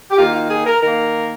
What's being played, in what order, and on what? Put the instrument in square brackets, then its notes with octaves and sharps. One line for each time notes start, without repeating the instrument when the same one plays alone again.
[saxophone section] G4
D#3 A#3 F4
F4
G#4
A#4
D#3 A#3 A#4